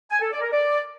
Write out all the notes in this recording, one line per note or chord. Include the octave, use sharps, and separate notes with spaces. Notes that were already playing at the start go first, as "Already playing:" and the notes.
G#5
A4
D5
A#4
D5